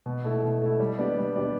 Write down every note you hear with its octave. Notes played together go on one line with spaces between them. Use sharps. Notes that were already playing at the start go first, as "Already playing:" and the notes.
B2
A3 E4
B2
A3 E4
G3
B3 D4 G4 D5
G3
B3 D4 G4 D5